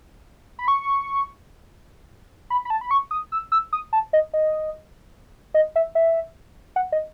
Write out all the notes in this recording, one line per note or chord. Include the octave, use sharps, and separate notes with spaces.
B5
C#6
B5
B5
A5
B5
C#6
D#6
E6
E6
D#6
A5
D#5
D#5
D#5
E5
E5
F#5
D#5